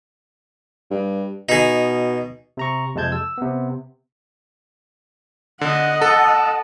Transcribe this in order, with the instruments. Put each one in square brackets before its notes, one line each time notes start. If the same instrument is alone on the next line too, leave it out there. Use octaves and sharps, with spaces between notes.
[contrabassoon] G2
[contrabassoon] B2 [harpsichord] D#4 G#4
[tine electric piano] C3 A#5 C#6
F2 C3 G#3 A5 G6 G#6
E6
C3 B3
[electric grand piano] D3 [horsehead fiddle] D#5 F#5
[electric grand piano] A4 [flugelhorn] A5